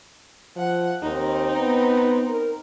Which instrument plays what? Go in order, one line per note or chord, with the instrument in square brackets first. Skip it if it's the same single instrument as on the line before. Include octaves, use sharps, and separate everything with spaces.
[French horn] F3 [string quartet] F#5
[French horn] D#2 [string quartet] C4 D#4
[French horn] B3
A#4